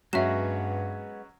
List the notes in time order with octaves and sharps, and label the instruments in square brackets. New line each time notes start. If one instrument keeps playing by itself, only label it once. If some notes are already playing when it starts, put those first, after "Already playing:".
[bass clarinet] G2 [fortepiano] F#3 C#4 F#4 [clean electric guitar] G#3 B3 [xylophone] E5 E7